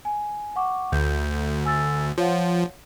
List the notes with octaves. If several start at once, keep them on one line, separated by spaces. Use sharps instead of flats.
G#5
F#5 C#6 D6
D2 G6
G#5 E6 A6
F3 C#5 F5 F#5